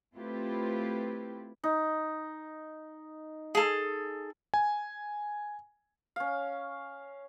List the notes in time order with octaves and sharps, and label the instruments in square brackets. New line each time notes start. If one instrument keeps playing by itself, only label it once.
[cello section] A3 C4 E4 F4 G4 B4
[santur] D#4
[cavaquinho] G#4 A4
[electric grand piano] G#5
[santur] C#4 F5